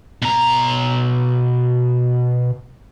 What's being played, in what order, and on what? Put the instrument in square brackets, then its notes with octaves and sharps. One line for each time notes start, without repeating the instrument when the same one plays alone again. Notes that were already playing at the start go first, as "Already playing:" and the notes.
[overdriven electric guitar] B2 A#5